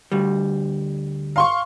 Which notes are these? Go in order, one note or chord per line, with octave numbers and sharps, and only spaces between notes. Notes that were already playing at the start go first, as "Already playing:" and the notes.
D2 G3
F5 C6 C#6